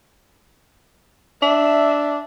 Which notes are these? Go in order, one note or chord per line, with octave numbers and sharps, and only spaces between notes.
D4 E5